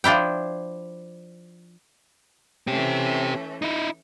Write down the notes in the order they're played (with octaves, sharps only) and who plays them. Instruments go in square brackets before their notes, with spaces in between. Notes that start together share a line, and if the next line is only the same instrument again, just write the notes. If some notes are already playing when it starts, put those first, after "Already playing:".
[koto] F3 D4 E4 G5
[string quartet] E3 A3 C#4 [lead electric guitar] C4 G4
[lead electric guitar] D#4 E4